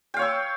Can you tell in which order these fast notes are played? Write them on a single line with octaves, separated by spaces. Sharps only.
G5 F5 C#5 E6